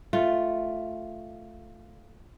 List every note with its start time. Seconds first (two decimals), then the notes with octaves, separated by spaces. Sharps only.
0.13 A3 F4